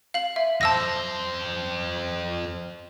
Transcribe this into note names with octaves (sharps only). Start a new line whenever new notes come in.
F5 F#7
E5
F2 C5 A5 E6 A#6